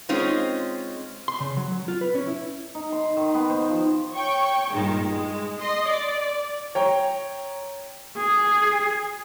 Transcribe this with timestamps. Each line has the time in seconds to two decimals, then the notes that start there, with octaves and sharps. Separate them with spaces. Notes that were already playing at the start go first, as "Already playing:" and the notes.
0.09 G#3 C4 C#4 D#4 F4
1.28 C6
1.40 C#3
1.57 F#3
1.72 F#3
1.88 F4
2.01 B4
2.15 C#4
2.27 E4
2.75 D#4
2.92 C6
3.17 D#3
3.34 B3
3.50 C5
3.70 F3
4.14 C#5 G5 C#6
4.71 G2 A#2 D#3 G#3
5.07 G#3
5.60 D#5 C6
5.89 D5
6.75 C#5 G5 A#5
8.17 G#4